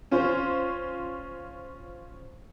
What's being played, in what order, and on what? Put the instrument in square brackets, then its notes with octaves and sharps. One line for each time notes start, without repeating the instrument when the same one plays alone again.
[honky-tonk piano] C#4 F4 C5